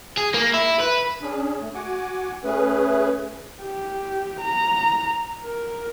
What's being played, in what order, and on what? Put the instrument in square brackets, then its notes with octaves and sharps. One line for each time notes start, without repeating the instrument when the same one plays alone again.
[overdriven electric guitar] G#4
A#3
E4
B4
[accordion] C#4 D4 G#4
A3
F#4 F#5 G#5 D6
A3 C#4 G#4 B4
[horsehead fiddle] G4
A#5
A#4